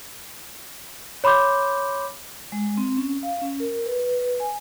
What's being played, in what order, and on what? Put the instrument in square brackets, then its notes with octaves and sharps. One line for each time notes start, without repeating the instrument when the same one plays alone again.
[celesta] C#5 B5 C6 D6 G6
[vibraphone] G#3
C4
C#4
F5
C#4
A#4
B4
B4
G#5